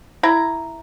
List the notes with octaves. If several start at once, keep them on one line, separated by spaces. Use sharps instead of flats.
E4 A#5